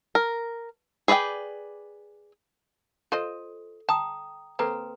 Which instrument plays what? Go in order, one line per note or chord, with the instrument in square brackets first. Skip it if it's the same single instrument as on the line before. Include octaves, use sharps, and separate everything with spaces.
[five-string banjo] A#4
G#4 B4 D5 E5 G5
[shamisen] F4 C5 D#5 [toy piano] A4
[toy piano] G5 A#5 D#6 [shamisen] A5
[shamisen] A#3 C4 [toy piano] A4 B4 A#5